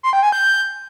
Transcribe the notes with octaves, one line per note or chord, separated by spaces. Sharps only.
C6
G5
G#5
G6